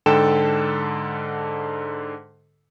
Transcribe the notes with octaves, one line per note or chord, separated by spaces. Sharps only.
G#2 D3 A4 G5 A5 E7